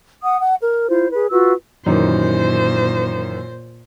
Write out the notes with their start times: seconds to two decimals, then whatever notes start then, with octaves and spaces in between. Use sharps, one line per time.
0.22 F#5 D#6
0.40 F#5
0.60 A#4
0.89 E4 F4 C5
1.13 G#4 B4
1.31 F4 F#4 B4 E6
1.86 F#2 A#2 D#3 E3 C5